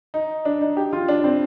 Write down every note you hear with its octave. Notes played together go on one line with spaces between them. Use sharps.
D#4
D4
D#4
G4
F4
D4
C4